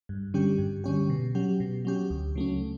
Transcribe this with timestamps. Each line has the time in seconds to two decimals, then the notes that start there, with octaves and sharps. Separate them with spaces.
0.09 G2
0.34 D3 G3 C#4 G4
0.59 G2
0.84 D3 G3 C#4 G4
1.10 B2
1.35 F#3 C#4 G4
1.60 B2
1.85 F#3 C#4 G4
2.10 D2
2.36 C#3 F#3 A3 C#4